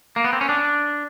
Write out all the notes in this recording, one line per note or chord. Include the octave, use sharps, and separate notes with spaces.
A#3
B3
C4
C#4
D4